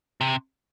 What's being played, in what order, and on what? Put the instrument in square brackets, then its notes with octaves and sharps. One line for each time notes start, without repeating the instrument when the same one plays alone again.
[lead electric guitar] C3